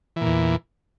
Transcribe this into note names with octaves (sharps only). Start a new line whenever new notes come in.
E2 A#2 E3